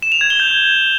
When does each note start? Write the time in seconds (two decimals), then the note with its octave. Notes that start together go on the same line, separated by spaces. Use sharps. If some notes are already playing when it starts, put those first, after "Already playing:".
0.02 E7
0.12 F7
0.21 G#6
0.30 G7
0.40 G6